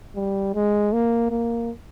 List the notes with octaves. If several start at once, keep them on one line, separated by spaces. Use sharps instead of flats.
G3
G#3
A#3
A#3